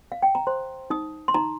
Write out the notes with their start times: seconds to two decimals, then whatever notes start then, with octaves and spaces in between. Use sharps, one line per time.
0.12 F5
0.22 G5
0.35 A#5
0.47 C5 C6
0.90 D#4 D#6
1.28 C6
1.34 D#4 A#5